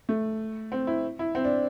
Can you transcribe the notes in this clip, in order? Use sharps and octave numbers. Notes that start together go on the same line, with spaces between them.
A3
C4
E4
E4
C4
D4